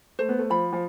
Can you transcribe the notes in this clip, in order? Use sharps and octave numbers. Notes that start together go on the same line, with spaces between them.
A3 C5
B3
A3
F3 B5
F3